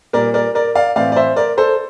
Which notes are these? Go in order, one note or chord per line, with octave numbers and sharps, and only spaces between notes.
A#2 G3 A#3 A#4 D5
A#4 D5
A#4 D5
D5 F5
A2 E3 A3 C4 D5 F5
D5
C5 E5
A#4 D5
A4 C5